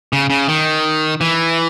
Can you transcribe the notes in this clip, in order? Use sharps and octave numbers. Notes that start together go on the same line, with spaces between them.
C#3
C#3
D#3
E3